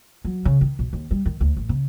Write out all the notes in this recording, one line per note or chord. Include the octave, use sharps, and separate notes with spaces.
F#3
C#3
D#3
B1
D#2
G3
D#3
D2
A1
C#3